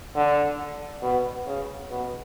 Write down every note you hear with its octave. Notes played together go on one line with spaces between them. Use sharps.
D3
B2
C#3
B2